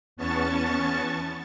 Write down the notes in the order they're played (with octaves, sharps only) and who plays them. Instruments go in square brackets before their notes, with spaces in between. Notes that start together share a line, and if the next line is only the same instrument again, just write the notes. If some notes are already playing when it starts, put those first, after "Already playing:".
[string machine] E2 B3 C#4 A5 C#6 A6